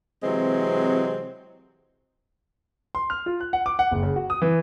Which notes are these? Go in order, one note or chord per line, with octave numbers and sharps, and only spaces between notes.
C3 E3 F#3 G#3 C4
C6
F6
F4
F#6
F#5
D6
F#5
F#1
C#3
F#4
D#6
E3